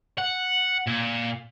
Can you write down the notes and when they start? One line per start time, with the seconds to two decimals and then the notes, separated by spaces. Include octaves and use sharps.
0.18 F#5
0.87 A#2